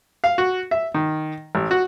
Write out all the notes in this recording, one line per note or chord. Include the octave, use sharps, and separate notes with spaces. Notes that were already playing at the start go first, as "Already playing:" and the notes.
F5
F#4
E5
D#3
A1
F#4